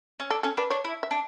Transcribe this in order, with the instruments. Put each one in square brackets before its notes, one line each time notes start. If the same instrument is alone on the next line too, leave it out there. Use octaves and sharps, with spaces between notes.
[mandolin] C#4
[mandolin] D4 [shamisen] A4
[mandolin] C#4 [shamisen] A4
[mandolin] D4 [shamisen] B4
[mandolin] D4 [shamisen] C#5
[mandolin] E4
[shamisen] E5
[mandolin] D4